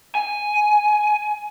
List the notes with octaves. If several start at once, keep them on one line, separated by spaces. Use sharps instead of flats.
G#5